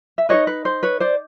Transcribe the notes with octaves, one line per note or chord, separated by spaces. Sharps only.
E5
D#4 G#4 B4 C#5 D#5
B4
C5
B4 C#5
C5 D5